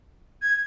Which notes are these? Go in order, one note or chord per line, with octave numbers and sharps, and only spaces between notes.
G#6